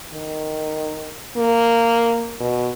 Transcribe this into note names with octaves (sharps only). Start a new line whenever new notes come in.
D#3
A#3
B2